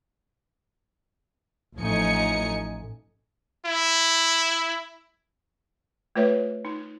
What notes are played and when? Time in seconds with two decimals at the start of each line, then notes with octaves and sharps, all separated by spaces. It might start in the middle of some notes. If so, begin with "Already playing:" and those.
1.78 A1 F3 A3 D#4 G#5 C#7
3.66 E4
6.16 A3 F4 B4 C#5 E5
6.65 D#4